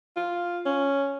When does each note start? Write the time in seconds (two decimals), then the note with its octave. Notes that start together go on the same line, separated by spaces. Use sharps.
0.16 F4
0.66 C#4